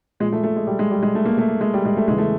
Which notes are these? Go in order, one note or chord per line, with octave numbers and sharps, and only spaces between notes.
A#2 F3 G#3
A3
A3
G#3
G3
G#3
G3
G#3
A3
A#3
A3
G#3
G3
G#3
A3
E2 C#3 E3 G#3
A3